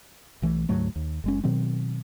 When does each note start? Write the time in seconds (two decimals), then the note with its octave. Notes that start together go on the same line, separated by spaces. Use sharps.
0.42 B1 E3 A3
0.69 D2 G#2 F#3 A3
0.96 D#2
1.24 F#1 G#3 C#4
1.44 B2 D#3 F#3 C4